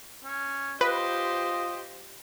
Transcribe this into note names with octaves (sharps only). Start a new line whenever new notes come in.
C#4
F4 G4 B4 C5 D#5